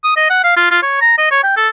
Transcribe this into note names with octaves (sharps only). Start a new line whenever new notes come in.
D#6
D#5
F#5
F5
F4
F4
C#5
A#5
D#5
C#5
G5
A4